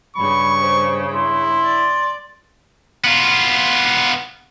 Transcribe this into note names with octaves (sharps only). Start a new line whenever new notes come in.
G2 C#3 B5 C#6
C5
E4 C6
D5
B3 F4